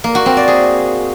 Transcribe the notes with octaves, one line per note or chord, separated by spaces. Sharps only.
A#3
F#4
C4
D5
G#4